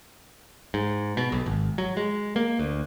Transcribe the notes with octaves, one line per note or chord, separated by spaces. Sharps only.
G#2
B2
B1
G#1
F#3
G#3
A#3
D2